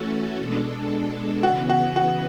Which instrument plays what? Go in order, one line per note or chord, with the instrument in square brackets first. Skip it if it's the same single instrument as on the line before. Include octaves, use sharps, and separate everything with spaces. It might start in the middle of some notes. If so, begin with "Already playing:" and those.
Already playing: [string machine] E3 A3 C#4 F#4 A4
B2 G#3 D4 A4
[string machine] C#3 E3 B3 [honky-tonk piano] F#4
[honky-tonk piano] F#4
F#4